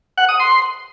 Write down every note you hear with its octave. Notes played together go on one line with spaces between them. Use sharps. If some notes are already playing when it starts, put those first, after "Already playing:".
F#5
D#6
C6